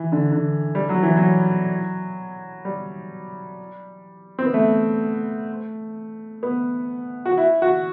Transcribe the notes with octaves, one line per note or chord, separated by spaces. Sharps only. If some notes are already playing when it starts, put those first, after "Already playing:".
Already playing: E3
D3
D3
G3
F#3
E3
F#3
G3
C4
B3
A3
B3
F#4
E4
F#4